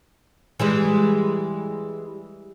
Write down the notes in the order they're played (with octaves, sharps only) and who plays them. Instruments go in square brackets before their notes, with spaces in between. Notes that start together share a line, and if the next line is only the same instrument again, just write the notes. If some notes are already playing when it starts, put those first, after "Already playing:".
[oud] E3 G3 G#3